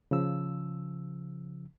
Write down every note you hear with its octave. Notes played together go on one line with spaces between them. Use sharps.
C#3 F3 E6